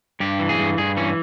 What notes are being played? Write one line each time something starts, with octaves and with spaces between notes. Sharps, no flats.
G2 G4
E3
G#4
G2
G2 G#4
E3 C#4